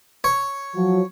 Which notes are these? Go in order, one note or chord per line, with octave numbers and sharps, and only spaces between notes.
C#5
F3 F#3